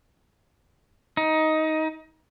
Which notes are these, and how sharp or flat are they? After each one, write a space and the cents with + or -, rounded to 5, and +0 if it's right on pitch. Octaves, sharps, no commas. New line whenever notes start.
D#4 +15